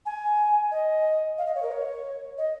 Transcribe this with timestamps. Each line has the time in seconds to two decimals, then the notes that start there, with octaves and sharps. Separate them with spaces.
0.06 G#5
0.71 D#5
1.38 F5
1.46 D#5
1.55 C#5
1.63 A#4
1.72 C#5
2.38 D#5